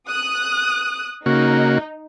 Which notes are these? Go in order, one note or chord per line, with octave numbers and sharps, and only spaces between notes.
D#6 F#6
C#3 A#3 D#4 F#4